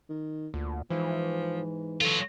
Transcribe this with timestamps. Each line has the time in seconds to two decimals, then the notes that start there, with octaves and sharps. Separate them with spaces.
0.09 D#3
0.54 D2 A#2
0.90 G#2 E3 F3
2.01 F#3 F4 A4